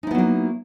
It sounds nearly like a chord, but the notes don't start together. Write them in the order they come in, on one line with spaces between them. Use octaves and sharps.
D#4 E4 B3 F#3 A#3